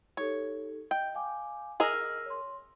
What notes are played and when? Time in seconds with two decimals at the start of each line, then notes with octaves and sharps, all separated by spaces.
0.17 D#4 G4 A4 C#5
0.91 D#5 G5
1.15 F5 G#5 D6
1.80 G#4 A#4 D#5 E6 F6 A#6
2.26 C#5 C6